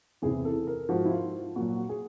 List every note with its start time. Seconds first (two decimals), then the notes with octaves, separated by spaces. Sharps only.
0.22 E2 C3 E3 G#4
0.45 A4
0.67 A#4
0.89 G#2 F3 F#4
1.05 E4
1.11 F4
1.56 A#2 F#3 F#4
1.89 G#4